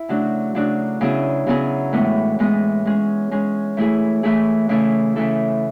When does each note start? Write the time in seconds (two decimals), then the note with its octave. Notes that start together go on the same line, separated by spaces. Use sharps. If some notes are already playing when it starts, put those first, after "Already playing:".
Already playing: E4
0.09 C#3 F#3 A3 D4 F#4
0.55 C#3 F#3 A3 D4 F#4
1.01 C#3 F#3 B3 E4 G#4
1.47 C#3 F#3 B3 E4 G#4
1.93 A2 E3 G#3 B3
2.39 A2 E3 G#3 B3
2.85 G#3 C#4 G#4
3.31 G#3 C#4 G#4
3.77 E3 A3 E4 G#4
4.23 E3 A3 E4 G#4
4.69 C#3 E3 A3 E4 A4
5.16 C#3 E3 A3 E4 A4